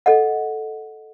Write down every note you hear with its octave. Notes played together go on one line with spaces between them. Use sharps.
A4 D#5 F#5